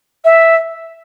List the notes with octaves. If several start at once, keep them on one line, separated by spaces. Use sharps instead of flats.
E5